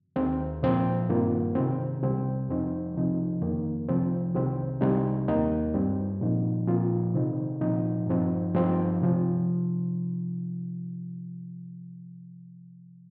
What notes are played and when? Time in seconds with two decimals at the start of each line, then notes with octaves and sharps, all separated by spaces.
0.16 D#2 D#3 C4
0.63 A#2 F3 C4
1.09 G2 D#3 A#3 F4
1.55 C3 D#3 C4
2.02 C2 C3 G3 C4
2.49 F2 F3 C4 D#4
2.95 C2 C3 F3 D#4
3.42 F2 D#3 A#3
3.89 C2 C3 F3 C4
4.35 C2 C3 D#3 C4
4.81 C2 C3 G3 D#4
5.28 D#2 D#3 A#3 D#4
5.74 G2 G3 C4
6.21 A#2 F3 D#4
6.68 A#2 F3 C4 F4
7.14 C3 D#3 C4 D#4
7.61 A#2 F3 C4 D#4
8.07 G2 F3 C4 D#4
8.54 G2 F3 C4 D#4
9.01 C3 F3